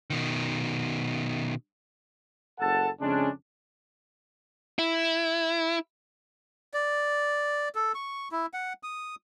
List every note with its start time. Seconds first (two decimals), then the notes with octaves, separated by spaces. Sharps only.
0.10 B2 D#3
2.59 F#1 A4 F#5 A5
3.01 F2 C#3 G#3 C#4 D4
4.79 E4
6.74 D5
7.75 A4
7.95 C#6
8.32 E4
8.54 F#5
8.83 D#6